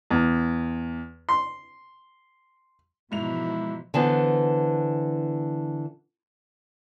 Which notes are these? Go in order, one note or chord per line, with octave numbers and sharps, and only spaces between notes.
E2
C6
G#2 B2 E3 F3 E4 F7
D3 E3 B3 C5